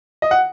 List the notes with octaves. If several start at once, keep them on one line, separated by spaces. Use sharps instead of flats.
D#5
F#5